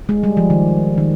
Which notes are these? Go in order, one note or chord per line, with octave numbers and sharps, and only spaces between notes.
G#3
G3
F3
D#3
D#3